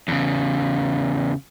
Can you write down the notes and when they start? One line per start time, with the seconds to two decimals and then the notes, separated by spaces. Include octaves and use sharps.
0.08 E2 C#3